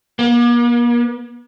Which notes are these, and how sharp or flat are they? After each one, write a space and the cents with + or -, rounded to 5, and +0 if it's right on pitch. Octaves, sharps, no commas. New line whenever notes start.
A#3 +45